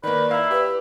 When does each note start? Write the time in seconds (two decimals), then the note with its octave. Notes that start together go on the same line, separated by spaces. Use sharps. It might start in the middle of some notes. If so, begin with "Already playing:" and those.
0.03 D#3 A#3 B4 D5
0.31 E4 F5 A#5
0.51 G4 B4